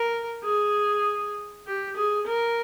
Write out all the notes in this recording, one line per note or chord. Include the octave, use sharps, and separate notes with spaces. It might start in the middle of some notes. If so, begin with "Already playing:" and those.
Already playing: A#4
G#4
G4
G#4
A#4